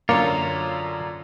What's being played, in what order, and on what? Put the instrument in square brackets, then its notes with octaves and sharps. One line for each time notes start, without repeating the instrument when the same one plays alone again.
[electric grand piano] F#2 D3 [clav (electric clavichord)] A#3 [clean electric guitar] F4 C#5 [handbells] D5 A#5 D6